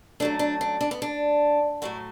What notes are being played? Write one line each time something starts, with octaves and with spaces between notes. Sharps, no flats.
F#2 F#3 A3 D4
D4
D4
D4
B3
D4
A2 F#3 A3 E4